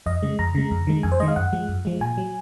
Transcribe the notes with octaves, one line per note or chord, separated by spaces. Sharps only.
F2 D#5
C#3 G#3
F2 A#5
C#3 G#3
F2
D#3 G#3
F2 G#5
C5
D#3 G#3 D#5
F5
F#2 F#5
F3 G#3
F#2
F3 G#3
A#2 G#5
F#3